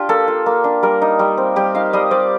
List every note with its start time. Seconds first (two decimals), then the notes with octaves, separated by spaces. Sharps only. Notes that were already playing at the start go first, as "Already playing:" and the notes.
Already playing: D4 F4 G4
0.09 A#3 A4
0.28 F4
0.46 A#3
0.64 D4
0.83 G3 A#4
1.02 D#4
1.19 G3
1.37 C4
1.56 G3 G4
1.75 D#4 F5
1.93 G3 D#5
2.11 C4 D5